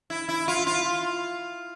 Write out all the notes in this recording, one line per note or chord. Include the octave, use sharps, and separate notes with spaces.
E4
E4
F4
F4